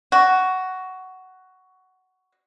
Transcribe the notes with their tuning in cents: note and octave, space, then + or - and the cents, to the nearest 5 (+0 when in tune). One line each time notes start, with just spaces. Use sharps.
F#4 +10